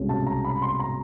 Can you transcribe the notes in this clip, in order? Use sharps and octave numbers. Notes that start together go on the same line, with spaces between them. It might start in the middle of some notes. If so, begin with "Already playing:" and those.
Already playing: C2 B2 G#3 C#4
A5
A#5
B5
C6
A#5